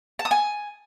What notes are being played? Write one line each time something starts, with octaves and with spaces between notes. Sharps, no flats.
A5
D#6
G#5